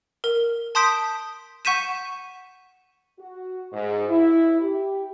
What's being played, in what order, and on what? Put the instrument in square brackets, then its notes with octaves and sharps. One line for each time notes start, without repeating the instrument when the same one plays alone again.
[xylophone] A#4
A5 C6 D#6 G6 B6 D7
F#5 C#6 G6 B6 D#7 E7
[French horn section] F#4
G#2
E4
G4